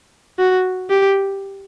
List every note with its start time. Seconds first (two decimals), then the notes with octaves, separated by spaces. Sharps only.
0.39 F#4
0.90 G4